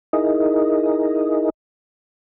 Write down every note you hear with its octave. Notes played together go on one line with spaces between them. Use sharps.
D#4 E4 G#4 A#4 D#5